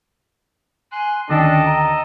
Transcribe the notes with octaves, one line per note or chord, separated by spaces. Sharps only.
G#5 C6 F#6
D2 D#3 C#4 D4 A4 D#5 G5
A#5